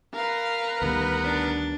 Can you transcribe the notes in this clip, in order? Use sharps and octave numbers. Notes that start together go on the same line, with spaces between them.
A#4 B4 F5
D2 D#3 G3 B3
D4